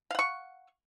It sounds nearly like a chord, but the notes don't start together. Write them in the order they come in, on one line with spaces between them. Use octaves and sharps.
F5 F#5 C#6